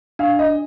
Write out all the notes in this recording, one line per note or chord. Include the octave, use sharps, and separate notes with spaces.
D4 F5
D#5